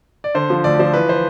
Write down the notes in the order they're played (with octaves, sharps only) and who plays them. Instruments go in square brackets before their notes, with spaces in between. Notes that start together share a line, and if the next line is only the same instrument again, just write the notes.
[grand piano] D5
D3 C5
F3
D2 D5
F3 C5
E3 B4
C5